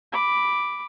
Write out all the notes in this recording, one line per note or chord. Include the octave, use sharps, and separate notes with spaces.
B5 D6